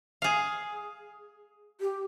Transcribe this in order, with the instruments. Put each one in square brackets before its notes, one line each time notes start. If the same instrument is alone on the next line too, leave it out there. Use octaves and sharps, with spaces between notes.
[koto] G#4 F5
[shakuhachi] G4